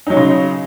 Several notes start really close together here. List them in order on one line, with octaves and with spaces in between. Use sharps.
D#4 F#3 C#4 C#3